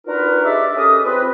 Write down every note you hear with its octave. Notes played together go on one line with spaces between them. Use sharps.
D4 D#4 F4 F#4 A#4 B4
D#4 G4 G#4 D5 E5
C#4 G4 A4 A#4 D#6
F3 C4 F4 B4